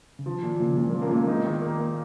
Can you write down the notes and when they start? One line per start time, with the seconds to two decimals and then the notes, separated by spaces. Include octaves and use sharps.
0.19 C#3
0.26 D#3 F3
0.42 A#2 D#3
0.59 A#2 C#3 F3
0.77 A#2 F3 G#3
0.90 F#3 A#3
0.94 F3
1.02 A#3 C#4
1.11 A#2 G#3 B3
1.27 D#4
1.44 D#3
1.62 A#3
1.79 A#3